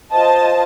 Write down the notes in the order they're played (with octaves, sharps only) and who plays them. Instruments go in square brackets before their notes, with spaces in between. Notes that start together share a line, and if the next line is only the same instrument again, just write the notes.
[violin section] F4 C5 D#5 A5